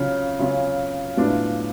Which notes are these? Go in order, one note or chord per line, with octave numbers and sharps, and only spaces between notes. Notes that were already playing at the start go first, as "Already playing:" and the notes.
Already playing: C#3 F#3 C#4 F4
C#3 F#3 C#4 F4
A2 F#3 B3 D4 F4